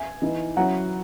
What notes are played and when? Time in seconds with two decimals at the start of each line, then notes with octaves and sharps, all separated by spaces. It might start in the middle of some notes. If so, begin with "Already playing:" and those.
Already playing: E5 G#5
0.22 E3 B3 D#4
0.57 F#3 C#4 E4 F#5 A#5